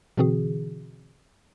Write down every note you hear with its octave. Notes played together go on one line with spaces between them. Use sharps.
B2 D3 E3 C4 F#4 G#4